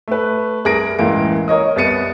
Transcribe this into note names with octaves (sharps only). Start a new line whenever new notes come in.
A3 B4
C2 G#4 A#4 A#6 D7
C#2 A2 E3 A#3 D7
A#4 C#5 D#5 D#6
C2 B3 A6 C#7 D#7